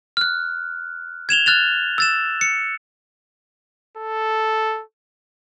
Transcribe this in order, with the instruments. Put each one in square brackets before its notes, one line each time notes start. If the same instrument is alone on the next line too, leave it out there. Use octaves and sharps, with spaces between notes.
[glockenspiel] F6 F#6
G#6 E7 F7 G7
F6 F#6 A6 F7
E6 A6 E7
C#7
[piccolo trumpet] A4